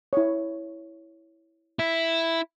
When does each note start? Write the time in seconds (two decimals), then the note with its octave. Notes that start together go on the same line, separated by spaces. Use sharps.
0.13 E4 C#5
1.79 E4